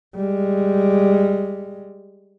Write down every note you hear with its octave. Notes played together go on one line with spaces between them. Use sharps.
G3 G#3